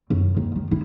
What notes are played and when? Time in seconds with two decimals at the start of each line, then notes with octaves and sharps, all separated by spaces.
0.10 F#2
0.37 D#2
0.56 D#3
0.71 E4